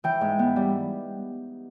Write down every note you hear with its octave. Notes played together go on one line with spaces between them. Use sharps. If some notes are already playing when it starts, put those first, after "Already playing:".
E3 G5
G#2
B3
G3